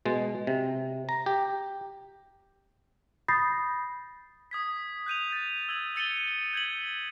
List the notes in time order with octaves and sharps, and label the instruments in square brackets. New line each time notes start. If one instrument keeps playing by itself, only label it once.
[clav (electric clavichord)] B2 G#3
C3
A#5
G4
[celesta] B5 D#6 G6 A6 A#6 C7
[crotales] D#6 G#6 B6
F#6 G6 D#7 F7
G6 A6
E6 G#6 F#7
E6 A6 C#7 D#7 F#7 G7
G6 G#6 B6 F#7